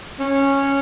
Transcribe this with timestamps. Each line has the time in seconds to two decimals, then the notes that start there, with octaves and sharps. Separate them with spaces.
0.19 C#4